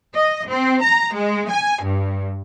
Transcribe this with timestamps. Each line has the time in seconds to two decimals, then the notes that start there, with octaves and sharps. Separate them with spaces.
0.14 D#5
0.48 C4
0.82 A#5
1.15 G#3
1.49 G#5
1.83 G2